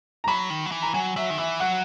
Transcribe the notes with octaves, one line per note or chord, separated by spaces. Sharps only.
A#5
F#3 B5
D#3
F#3
E3
A#5
F#3 G#5
F#3 E5
D#3
E3 E5
F#3 F#5